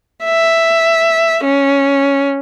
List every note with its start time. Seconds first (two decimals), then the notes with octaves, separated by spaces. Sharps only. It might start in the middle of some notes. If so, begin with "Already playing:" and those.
0.25 E5
1.44 C#4